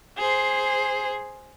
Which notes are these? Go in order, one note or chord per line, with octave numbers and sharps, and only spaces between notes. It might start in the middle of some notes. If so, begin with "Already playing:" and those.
G#4 C5